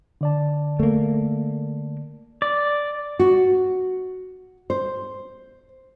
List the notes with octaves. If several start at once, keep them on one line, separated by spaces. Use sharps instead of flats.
D3 D5 A5
A3 A#3
D5
F#4
C5